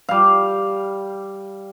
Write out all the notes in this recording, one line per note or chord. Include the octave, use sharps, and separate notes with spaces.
G3 F5